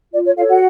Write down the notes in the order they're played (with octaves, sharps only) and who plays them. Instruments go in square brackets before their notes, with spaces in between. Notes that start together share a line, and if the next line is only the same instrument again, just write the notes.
[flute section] F4 D5
C#5
F4 A4 C#5 F5
F#4 F#5